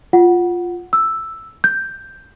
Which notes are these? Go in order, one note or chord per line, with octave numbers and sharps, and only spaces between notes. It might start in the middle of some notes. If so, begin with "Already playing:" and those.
F4 F#5
E6
G6